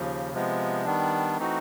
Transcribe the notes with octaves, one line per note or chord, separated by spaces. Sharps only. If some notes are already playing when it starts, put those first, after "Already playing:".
Already playing: D#2 C#3 F3
C3 F3 G#3 B3
D#3 G3 B3 D4
E3 A3 C4 D#4 F#4